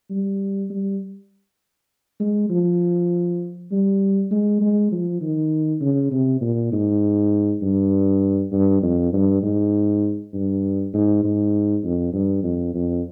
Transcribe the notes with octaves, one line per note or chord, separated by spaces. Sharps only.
G3
G3
G#3
F3
G3
G#3
G#3
F3
D#3
C#3
C3
A#2
G#2
G2
G2
F2
G2
G#2
G2
G#2
G#2
F2
G2
F2
F2